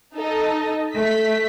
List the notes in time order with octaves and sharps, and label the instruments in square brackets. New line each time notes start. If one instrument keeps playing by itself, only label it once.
[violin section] D#4 A4 D#5
[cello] A3 [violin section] B6